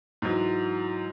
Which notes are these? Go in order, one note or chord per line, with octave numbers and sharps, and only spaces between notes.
G#2 E3 F#3